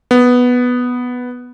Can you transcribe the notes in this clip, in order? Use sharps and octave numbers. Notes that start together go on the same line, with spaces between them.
B3